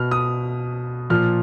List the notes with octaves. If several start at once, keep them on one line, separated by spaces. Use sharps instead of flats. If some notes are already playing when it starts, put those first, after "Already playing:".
Already playing: B2 F6
D#6
A#2 F3 F6